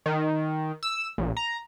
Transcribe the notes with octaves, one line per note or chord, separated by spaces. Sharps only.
D#3
E6
A#1
A#5